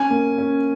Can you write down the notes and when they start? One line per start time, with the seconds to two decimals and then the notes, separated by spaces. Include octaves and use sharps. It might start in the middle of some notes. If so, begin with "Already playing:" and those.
Already playing: C#4 G#5
0.10 A#3
0.38 C#4